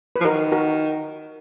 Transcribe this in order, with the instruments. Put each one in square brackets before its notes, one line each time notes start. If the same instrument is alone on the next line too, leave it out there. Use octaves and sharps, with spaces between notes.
[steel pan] B4
[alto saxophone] F3
[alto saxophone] D#3 [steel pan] F#4 A#4
[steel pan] F#4 A#4